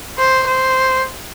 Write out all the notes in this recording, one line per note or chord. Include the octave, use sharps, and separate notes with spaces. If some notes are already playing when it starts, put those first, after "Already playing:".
C5
C5